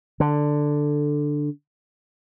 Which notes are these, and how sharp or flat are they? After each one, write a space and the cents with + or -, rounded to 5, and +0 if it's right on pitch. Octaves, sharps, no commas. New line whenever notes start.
D3 +5